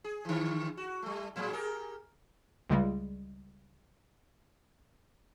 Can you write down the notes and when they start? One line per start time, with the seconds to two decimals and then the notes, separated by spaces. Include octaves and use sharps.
0.04 G#4
0.25 D3 E3
0.77 F#4
1.03 G3 A3
1.36 A2 F#3 G#3
1.53 G4 G#4 A#4
2.70 C#2 C#3 G3 G#3